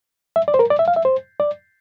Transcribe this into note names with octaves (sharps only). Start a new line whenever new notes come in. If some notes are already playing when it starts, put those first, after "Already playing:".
E5
D5
C5
A#4
D5
E5
F5
E5
C5
D5